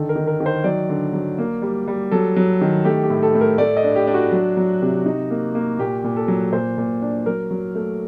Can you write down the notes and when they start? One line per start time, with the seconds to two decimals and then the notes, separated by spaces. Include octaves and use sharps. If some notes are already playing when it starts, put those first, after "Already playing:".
Already playing: D3 D#3 A4
0.09 A#4
0.16 D#3
0.27 A#4
0.40 D#3
0.46 C5
0.64 F#3 D5
0.89 D3
1.13 F#3
1.38 A#3
1.62 G3
1.88 G3
2.11 F#3 A4
2.36 F#3
2.61 D#3
2.85 A3 G4
3.03 G4
3.10 A2
3.23 A4
3.34 A2
3.41 A#4
3.58 A3 D5
3.77 D#5
3.84 D4
3.96 G4
4.07 D4
4.14 F#4
4.32 F#3
4.57 F#3
4.82 C3
5.06 D#4
5.30 A#3
5.55 A#3
5.79 A#2 G4
6.04 A#2
6.16 A4
6.28 F#3
6.52 A#2 C5
6.78 A#2
7.02 D4
7.26 F#3 A#4
7.51 F#3
7.75 A3